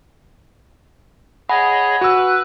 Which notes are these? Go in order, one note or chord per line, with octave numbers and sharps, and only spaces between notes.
G#4 C#5 D#5 F#5 G#5 B5
F#4 B4 E6 F#6